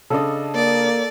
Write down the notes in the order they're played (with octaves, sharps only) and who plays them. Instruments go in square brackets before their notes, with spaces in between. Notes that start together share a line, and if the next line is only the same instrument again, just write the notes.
[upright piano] C#3 D4 [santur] A4 D#5
[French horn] A#3 [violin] D5